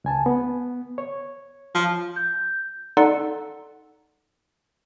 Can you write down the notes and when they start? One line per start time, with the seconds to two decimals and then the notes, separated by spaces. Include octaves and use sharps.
0.04 C#2 G#5 A5
0.26 B3
0.98 C#5
1.75 F3
2.16 G6
2.97 D#4 A4 D5 F#5 C6